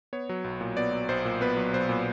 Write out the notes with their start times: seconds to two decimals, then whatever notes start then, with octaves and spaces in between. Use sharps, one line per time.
0.13 B3 C#5
0.29 F#3
0.44 B1
0.61 A#2
0.77 B3 D5
0.93 F#3
1.09 B1 C5
1.25 A#2
1.41 B3 B4
1.57 F#3
1.73 B1 C5
1.89 A#2